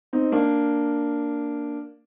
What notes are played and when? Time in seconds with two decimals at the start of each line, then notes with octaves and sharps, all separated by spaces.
0.13 C4 D#4
0.32 A#3 D4